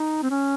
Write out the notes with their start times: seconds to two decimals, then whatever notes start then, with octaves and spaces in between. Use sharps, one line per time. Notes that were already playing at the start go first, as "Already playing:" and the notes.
Already playing: D#4
0.23 C4
0.30 C#4